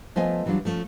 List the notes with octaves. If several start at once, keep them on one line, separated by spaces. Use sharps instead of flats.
F3 A3 B3 F4 D#5 G#5
E3 F#3 G3 D4 F4
F3 A3 C#4 F4